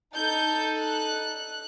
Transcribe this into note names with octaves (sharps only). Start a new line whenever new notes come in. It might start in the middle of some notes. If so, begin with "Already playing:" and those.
D#4 A4 G6
F#6